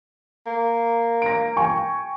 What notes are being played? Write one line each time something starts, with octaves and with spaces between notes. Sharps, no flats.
A#3
A#6 D7
G5 G#5 C#6